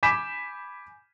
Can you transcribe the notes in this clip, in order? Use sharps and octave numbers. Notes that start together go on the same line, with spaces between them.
G#5 B5 D6 G6 B6 E7